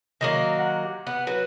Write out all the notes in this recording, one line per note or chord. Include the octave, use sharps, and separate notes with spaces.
D#3 F#3 A#3
F#5
G4
B3 F#5
F#3 B4